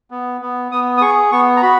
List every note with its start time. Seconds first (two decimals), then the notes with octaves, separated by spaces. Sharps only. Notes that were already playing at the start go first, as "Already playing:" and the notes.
0.11 B3
0.41 B3
0.72 B3 D#6
0.97 D#6
1.01 G#4 C#6
1.32 B3 C#6
1.57 A#5
1.62 F#4 B5